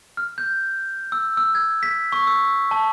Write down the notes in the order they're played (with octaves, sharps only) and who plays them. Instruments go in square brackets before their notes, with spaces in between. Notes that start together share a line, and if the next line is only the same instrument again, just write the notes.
[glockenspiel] F6
G6
E6
E6
G#6
B6
C#6
E6
A5